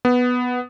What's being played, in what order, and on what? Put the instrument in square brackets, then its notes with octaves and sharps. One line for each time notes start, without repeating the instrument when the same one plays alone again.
[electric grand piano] B3